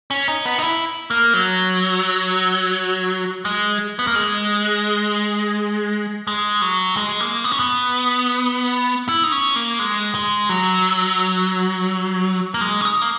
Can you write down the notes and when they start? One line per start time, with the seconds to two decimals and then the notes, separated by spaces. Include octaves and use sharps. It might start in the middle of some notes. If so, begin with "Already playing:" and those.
0.11 C#4
0.28 D#4
0.45 B3
0.58 D#4
0.62 E4
1.10 A#3
1.34 F#3
3.45 G#3
3.99 B3
4.07 A#3
4.15 G#3
6.27 G#3
6.62 F#3
6.97 G#3
7.21 A#3
7.44 B3
7.52 C#4
7.59 B3
9.09 E4
9.23 D#4
9.32 C#4
9.56 A#3
9.79 G#3
10.15 G#3
10.49 F#3
12.54 A#3
12.61 G#3
12.81 C#4
12.85 D#4
13.01 A#3